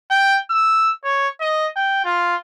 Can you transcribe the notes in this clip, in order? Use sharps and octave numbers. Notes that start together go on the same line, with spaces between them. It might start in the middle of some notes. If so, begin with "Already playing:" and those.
G5
E6
C#5
D#5
G5
F4